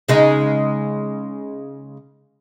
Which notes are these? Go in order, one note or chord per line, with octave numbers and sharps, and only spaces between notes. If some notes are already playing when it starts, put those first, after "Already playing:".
C#3 G#3 D#4